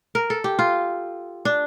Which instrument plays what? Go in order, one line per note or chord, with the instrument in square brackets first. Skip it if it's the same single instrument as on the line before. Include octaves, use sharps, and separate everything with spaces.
[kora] A#4
A4
G4
F4
D4